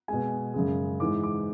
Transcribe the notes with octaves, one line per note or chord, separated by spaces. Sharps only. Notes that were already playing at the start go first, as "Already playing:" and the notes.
B2 G#3 G#5
F#2 C#3 G#3
G#2 E3 G#3 D6
D6